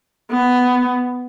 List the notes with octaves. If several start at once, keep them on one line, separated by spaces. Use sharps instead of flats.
B3